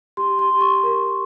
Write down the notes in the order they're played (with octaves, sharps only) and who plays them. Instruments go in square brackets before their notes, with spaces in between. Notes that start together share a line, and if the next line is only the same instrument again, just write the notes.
[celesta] G4 C6
C6
G4
C#6
A#4